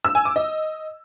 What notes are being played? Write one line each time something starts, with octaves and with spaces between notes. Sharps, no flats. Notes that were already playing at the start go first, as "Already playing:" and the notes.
E6
G#5
D6
D#5